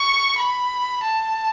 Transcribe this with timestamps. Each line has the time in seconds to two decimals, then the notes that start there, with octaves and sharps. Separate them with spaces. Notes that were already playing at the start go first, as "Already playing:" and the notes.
Already playing: C#6
0.38 B5
1.03 A5